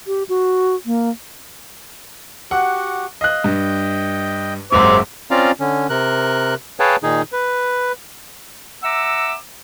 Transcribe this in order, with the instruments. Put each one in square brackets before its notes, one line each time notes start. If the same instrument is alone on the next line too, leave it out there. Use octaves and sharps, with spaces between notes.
[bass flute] G4
F#4
A#3
[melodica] F#4 G4 [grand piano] F#5
[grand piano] D#5 F#6 [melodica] F5
[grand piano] G2 [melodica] D#5 G5
[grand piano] F#1 G#2 [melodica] F#3 C4 E5 [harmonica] C5 D6
[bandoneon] C4 C#4 F4 D5 F5 A#5
D3 C#4
C3 A#4 F#6
G#4 B4 C#5 F5 G5 A5
A#2 D#3 D#4 G#4
B4
[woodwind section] E5 F#5 A#5 D6 E6